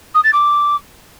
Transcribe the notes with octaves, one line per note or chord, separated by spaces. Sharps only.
D#6
A6
D6